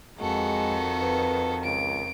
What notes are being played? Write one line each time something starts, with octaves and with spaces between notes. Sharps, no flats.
F2 D#3 G#3 F#4 A4
B4
C#2 D7